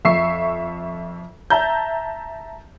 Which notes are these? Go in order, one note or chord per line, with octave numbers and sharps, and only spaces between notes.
F2 E5 C#6 C7
E5 A5 A#5 G6